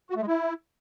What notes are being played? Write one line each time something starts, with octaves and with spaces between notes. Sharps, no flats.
F#4
A3
G#3
E4